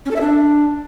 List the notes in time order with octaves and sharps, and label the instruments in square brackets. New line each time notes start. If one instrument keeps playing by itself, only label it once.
[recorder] C#4
A4
E5
D4